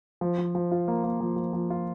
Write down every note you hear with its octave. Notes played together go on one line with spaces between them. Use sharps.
F3
F3
F3
F4
A#3
A#3
F3
F3
F3
F4